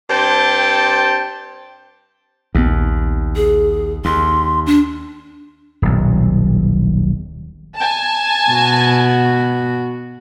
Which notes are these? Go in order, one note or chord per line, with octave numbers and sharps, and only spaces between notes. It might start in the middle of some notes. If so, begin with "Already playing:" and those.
G2 C4 C5 G5 A5
A#1 D#2 B3
G#4
D#2 C6
D4
D#1 B1
G#5 A5
B2 F#4